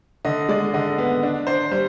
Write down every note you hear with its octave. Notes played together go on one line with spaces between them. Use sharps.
D3 D#5
G#3 D5
D3 D#5
B3
D4
D4 C5
G3 C5